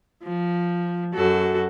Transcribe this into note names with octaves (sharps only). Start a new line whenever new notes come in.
F3
F#2 F#4 A4